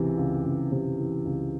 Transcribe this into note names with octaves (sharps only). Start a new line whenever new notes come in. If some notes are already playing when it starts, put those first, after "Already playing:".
Already playing: C#2 C3 E3
C#2
C#2
C3
E3
C#2